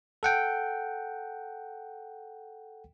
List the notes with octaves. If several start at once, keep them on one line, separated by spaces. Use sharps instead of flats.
A4 F#5 G5